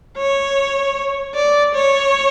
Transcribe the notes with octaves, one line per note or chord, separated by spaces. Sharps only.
C#5
D5
C#5